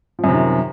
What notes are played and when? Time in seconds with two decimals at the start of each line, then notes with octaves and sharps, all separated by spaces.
0.19 F3
0.24 F#2
0.29 C3
0.34 D#3